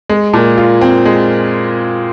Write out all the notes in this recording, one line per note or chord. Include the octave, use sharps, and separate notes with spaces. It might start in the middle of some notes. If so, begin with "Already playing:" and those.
G#3
A#2
F4
C4
G#3